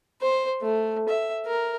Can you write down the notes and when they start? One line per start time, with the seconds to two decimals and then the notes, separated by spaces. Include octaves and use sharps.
0.22 C5
0.62 A3
1.09 E5
1.46 A#4